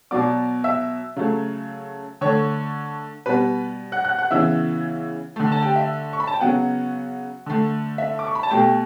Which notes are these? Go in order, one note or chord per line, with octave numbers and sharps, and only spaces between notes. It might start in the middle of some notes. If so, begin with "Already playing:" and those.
B2 F#3 B3 D5 D6
E5 E6
C#3 F#3 A3
D3 A3 C#5 C#6
B2 G3 B3 B4 B5
F#5 F#6
F#5 F#6
F#5 F#6
C#3 E3 B3 E5 E6
D3 A3
A5
G4 G5
E5
C#6
B5
A5
G5
C#3 F#3 B3 F#4 F#5
D3 A3
E5
D6
C#6
B5
A5
B2 A3 G4 G5